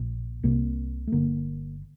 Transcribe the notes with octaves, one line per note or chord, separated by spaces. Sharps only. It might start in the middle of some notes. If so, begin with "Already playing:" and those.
Already playing: A#1 A#2
C2 C3 A#3
A3
G1 G2 D3 A#3